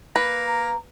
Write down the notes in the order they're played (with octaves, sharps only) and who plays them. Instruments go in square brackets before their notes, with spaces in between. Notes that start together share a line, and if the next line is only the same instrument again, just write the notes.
[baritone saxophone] A#3 [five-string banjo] B4
[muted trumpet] A#5